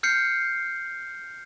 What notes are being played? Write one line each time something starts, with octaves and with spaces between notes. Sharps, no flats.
F6 G6 C7 C#7